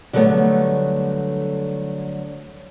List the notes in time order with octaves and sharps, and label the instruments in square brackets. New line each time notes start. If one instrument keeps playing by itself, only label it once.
[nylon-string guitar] D3 F#3 G3 A3 B3